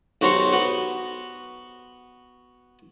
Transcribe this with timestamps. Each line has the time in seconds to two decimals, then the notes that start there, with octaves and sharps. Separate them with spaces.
0.21 B1 F#4 G4 C5 A#5 C#6
0.53 B3 F#4